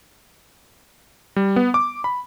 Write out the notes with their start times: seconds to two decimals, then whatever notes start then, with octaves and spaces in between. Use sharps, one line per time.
1.36 G3
1.56 B3
1.74 D6
2.04 B5